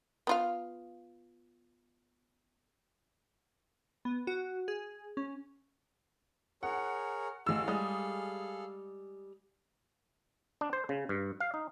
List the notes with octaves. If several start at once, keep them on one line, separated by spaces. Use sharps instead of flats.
B3 F4 F5
B3
F#4
G#4
C#4
G#4 A#4 C#5 F#5
A1 G#4 A4 F5 E6
G3 G#3 D#6
D4
C5
C#3
G2
F5
D#4